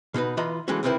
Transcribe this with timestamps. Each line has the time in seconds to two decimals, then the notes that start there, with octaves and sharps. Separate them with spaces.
0.14 B2 D#4 F#4 B4
0.37 E3 F4 B4 D#5 A#5 B5
0.68 E3 F#3 G#3 A3 C#4 F#4
0.83 C#2 C3 D#3 C4 E4 B4